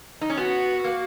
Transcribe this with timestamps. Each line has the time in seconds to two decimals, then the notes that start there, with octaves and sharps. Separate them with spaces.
0.21 D#4
0.30 C#4
0.37 B3 F#4
0.84 A#3